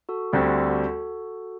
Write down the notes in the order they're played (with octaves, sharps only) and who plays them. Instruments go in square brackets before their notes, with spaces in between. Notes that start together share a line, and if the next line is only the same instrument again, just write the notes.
[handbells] F#4 A4
[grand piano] D2 D3 G3 C4 [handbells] F#4 A4
[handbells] F#4 A4